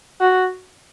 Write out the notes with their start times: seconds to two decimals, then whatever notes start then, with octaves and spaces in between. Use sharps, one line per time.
0.21 F#4